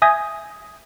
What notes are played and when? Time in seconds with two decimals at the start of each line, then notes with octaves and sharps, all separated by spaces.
0.02 E5 G#5 D#6 G6 G#6 A#6